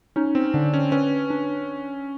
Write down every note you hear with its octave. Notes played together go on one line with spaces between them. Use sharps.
C#4 D#4
C4
D3 D4
C#4
C#4 B4
D4